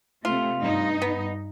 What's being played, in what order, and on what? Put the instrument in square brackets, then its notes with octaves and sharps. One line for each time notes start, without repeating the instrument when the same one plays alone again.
[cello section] C3 A3 [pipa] F4
[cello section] G2 D#4
[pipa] B3